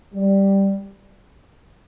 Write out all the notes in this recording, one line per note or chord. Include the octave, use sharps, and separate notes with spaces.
G3